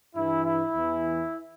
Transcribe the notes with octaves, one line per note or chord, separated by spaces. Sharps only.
G2 E3 E4
E4
E2 E3